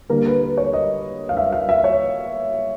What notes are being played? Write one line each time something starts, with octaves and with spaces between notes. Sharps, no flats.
D3 G3 A#3 A#4
B4
B4
C#5
D#5
F5
E5
F5
E5
C#5